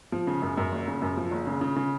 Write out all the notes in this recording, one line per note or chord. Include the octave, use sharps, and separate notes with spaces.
F3
C#3
F#2
F#2
F#1
C#3
F#2
F3
F#1
C#3
C#3
C#3